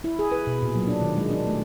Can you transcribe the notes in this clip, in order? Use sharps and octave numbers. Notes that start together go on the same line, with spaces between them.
E4
G#4
B4
B2
A#2
F#3
D4
D#3
G#3
D4
A3